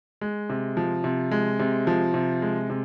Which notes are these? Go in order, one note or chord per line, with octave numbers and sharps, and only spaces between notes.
G#3
C3
F3
C3
G#3
C3
F3
C3
G#3
C3